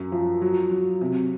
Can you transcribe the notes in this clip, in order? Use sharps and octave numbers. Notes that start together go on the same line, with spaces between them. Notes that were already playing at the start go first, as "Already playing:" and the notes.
Already playing: F#2
F3
F#3
F#3
C3